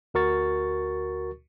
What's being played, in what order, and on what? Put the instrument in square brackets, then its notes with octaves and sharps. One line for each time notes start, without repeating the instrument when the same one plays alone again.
[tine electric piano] D2 F#4 A#4 C#6 A6